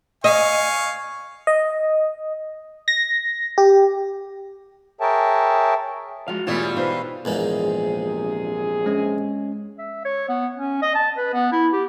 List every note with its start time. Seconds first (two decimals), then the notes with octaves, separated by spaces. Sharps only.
0.24 D#5 F5 G#5 C#6
1.47 D#5
2.88 A#6
3.58 G4
5.01 G#4 A#4 C#5 E5 G5 A5
6.28 F3 G#3 F#4 F5
6.47 E2 B2 E3 G3 A3 F4 G#4 C#5
6.77 B2 D#4 B4 C5 F5
7.25 A#1 E2 G#2 C3 A#3 G#4
8.86 G#3 C#4
9.79 E5
10.05 C#5
10.29 B3
10.56 C#4
10.82 D#5
10.95 A5
11.17 B4
11.33 B3
11.52 E4
11.73 G4